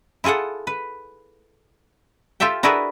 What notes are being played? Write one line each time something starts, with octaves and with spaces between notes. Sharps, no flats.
E4 F4 G#4 A4 F#5
B4
F4 G4 A4 E5 G5
D4 E4 F#4 G#4 A#4 B4